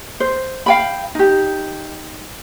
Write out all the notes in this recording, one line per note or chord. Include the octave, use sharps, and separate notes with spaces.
C5
F5 G5 B5
D#4 G4